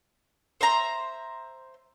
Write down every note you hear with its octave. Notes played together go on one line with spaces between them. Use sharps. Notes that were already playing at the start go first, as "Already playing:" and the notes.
C5 E5 A#5